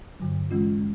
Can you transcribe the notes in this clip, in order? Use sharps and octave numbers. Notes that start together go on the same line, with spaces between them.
G2 D3 F#3
E3 G#3 C#4 F4